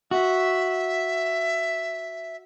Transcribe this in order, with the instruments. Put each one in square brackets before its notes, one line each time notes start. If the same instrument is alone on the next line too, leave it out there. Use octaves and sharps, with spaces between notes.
[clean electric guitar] F#4 [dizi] E5